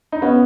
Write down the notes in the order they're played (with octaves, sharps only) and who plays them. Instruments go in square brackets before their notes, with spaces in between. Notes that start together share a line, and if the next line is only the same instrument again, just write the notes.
[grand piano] D#4
[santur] B3 [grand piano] C#4